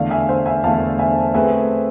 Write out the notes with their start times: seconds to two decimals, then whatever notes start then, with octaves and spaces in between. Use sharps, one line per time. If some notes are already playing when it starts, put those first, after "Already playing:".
Already playing: E2 D3 A3 D5 F5
0.10 E5 G#5
0.29 C5 E5
0.46 E5 G#5
0.64 E2 D3 A3 F5 A5
0.99 E5 G#5
1.34 A3 C4 G#4 B4 E5 G#5